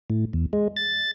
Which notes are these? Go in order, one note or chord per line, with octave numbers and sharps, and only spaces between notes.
A2
E2
G#3
A6